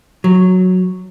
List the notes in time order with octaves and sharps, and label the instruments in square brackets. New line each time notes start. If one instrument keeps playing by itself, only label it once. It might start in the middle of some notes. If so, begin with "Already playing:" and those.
[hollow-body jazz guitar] F#3